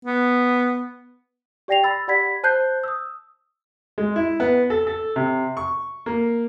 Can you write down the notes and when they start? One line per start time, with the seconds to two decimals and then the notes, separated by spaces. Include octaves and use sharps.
0.05 B3
1.68 G4 D5 G5 A#6 C7 F7
1.84 B5 E6 A6
2.08 G4 D5 F#5 B5 G#6 B6
2.43 C5 A5 F#6 G6 C7
2.84 D#6 E6
3.98 G#3
4.16 E4
4.40 B3
4.70 A4
4.87 A4
5.16 C3
5.57 C#6
6.06 A#3